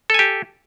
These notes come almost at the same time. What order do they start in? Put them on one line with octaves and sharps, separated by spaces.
A4 G#5 G4